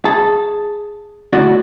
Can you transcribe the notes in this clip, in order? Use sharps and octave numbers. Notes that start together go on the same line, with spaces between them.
G#4 A5
A2 D3 E4 F#4 D5